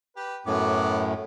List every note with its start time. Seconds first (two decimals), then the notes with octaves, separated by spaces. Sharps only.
0.16 G4 B4
0.46 F#2 A2 F#3 B3 D6